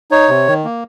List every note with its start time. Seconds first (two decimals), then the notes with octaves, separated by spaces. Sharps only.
0.11 D#4 C#5
0.29 C3
0.47 D#3
0.65 A#3